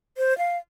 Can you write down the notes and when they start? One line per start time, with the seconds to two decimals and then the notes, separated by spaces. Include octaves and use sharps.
0.17 C5
0.38 F5